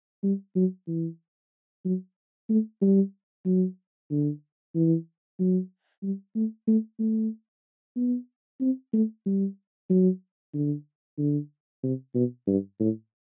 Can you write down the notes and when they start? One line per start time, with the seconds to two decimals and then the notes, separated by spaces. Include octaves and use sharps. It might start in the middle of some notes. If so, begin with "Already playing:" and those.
0.23 G3
0.56 F#3
0.88 E3
1.85 F#3
2.49 A3
2.81 G3
3.45 F#3
4.10 D3
4.75 E3
5.39 F#3
6.03 G3
6.35 A3
6.67 A3
6.99 A3
7.96 B3
8.61 C4
8.93 A3
9.26 G3
9.90 F#3
10.54 D3
11.18 D3
11.83 C3
12.15 B2
12.47 G2
12.79 A2